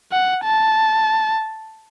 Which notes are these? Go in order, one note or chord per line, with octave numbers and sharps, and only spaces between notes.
F#5
A5